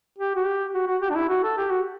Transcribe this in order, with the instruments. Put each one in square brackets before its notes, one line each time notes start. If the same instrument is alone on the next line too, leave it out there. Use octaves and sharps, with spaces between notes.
[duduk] G4
F#4
G4
F#4
F#4
G4
D4
E4
F#4
A4
G4
F#4